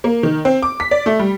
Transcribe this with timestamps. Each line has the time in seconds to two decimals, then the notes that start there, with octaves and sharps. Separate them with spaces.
0.04 A#3
0.23 D#3
0.45 C4
0.62 D6
0.80 B6
0.91 D5
1.06 A3
1.19 G3